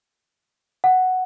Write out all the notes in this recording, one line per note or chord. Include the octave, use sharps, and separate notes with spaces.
F#5